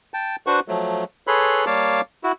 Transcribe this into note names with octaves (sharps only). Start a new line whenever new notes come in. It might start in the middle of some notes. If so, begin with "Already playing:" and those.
G5 A5
D4 F#4 B4 C5 F#5 C#6
F3 F#3 A3
G#4 A4 B4 C#5 B5 C6
G3 A#3 C#5 F5 A5 D6
E4 F#4